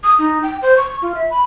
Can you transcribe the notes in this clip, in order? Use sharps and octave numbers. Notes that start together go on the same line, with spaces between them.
D#6
D#4
G5
C5
C#6
F4
E5
B5